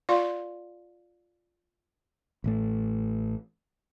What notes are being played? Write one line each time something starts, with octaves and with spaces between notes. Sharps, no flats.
F4 D5 F5 C6
A1 A2 A3